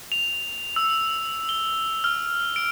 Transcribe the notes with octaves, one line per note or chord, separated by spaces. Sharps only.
F7
E6
G7
F6
D7